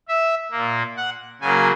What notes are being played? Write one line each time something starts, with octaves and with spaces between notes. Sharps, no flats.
E5
A#2 A#3
F#5
C#3 F#3 A#3 G#5